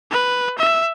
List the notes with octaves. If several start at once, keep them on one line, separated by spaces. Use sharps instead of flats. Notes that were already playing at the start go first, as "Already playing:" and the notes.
B4
E5